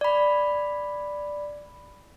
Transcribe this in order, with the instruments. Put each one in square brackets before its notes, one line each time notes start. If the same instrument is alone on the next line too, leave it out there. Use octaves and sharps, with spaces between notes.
[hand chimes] D5 B5